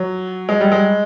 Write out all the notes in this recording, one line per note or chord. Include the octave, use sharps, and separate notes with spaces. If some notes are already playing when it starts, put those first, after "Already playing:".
Already playing: F#3
G#3
G3
G#3